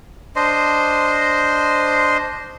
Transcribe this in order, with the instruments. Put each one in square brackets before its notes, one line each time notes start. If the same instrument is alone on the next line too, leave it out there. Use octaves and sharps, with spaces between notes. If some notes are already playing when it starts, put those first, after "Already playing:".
[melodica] D4 C5 D#5 C6